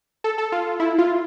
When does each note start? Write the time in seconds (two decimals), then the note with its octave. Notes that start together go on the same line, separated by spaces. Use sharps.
0.24 A4
0.38 A4
0.52 F4
0.80 E4
0.98 F4